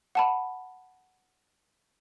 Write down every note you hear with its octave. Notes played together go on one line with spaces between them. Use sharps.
F#5 A5 B5